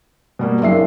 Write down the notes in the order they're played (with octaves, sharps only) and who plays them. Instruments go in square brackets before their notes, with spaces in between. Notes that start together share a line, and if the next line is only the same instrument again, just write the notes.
[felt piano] B2 G3 A#3
[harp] F#1 [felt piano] D4 E5 C7